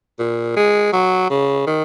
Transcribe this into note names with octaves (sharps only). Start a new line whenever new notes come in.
A#2
G#3
F#3
C#3
D#3